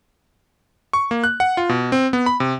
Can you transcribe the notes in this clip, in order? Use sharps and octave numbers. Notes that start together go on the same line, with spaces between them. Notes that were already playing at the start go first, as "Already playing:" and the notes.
C#6
A#3
F#6
F#5
F4
B2
C4
B3
B5
C3